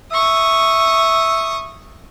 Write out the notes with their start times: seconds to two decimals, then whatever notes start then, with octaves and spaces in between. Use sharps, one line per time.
0.12 E5 C#6 D#6